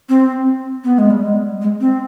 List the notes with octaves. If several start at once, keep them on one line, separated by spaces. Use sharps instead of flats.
C4
B3
G#3
G3
G#3
G#3
C4